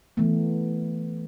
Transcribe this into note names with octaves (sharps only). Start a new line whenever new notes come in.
E3 A3 B3